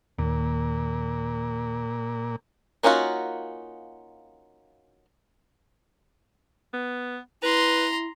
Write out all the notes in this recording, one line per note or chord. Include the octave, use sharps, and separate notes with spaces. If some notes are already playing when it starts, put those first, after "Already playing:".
D#2 A#2
A#3 C#4 D#4 F4 F#4
B3
E4 B4 A#5 C6